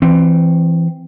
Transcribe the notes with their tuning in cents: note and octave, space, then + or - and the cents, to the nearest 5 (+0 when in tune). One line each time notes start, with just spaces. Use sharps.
E3 +20 C4 +0